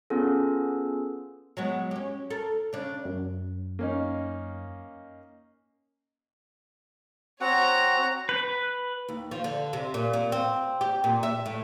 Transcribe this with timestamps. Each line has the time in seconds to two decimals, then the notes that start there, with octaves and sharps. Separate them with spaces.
0.10 B3 C#4 F4 G#4 A4
1.57 F#3 G#3 B3
1.91 C#4 G4
2.30 A4 A#4
2.73 C#3 D4
3.05 F#2
3.79 A#3 C#4 D#4
7.41 C4 F#4 C#5 F#5 A#5
8.29 B4
9.09 D#2
9.31 F3
9.44 D3
9.73 C3
9.94 A#2
10.13 A#2
10.32 C4
10.81 G4
11.04 A#2
11.23 E5
11.46 A2